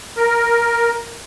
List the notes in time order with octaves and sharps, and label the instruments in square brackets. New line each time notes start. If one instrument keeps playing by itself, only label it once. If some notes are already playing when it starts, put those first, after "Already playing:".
[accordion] A#4